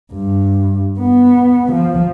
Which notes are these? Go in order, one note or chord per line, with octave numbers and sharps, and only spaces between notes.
G2
B3
F3